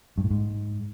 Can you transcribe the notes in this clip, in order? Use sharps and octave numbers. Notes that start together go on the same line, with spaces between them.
G2
A2
G#2